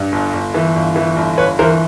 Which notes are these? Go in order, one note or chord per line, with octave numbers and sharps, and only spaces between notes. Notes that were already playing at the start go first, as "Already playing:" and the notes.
Already playing: G2
G1
G1
E3
G1
E3
G1
G1 B4 C#5
E3 A#4 C5